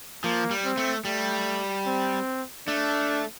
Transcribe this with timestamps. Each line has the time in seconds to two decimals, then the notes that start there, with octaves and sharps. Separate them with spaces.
0.24 F3 A#3
0.51 G3
0.65 C4
0.77 A3
1.05 G3 A3
1.86 C4
2.67 A3 D4